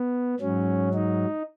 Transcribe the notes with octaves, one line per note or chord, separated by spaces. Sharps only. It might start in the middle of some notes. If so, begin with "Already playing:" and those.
Already playing: B3
G#2 F#3 C#4
D#4